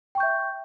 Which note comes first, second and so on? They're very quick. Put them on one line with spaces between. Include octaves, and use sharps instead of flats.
G5 C#6 G6 E5